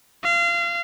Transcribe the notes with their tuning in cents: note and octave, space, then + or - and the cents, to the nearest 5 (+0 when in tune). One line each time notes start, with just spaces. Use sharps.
F5 -30